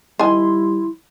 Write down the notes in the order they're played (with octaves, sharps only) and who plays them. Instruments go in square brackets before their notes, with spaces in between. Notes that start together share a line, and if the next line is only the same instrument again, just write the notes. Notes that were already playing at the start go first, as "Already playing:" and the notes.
[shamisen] D#3 G#5 [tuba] G3 [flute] E4 [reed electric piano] C6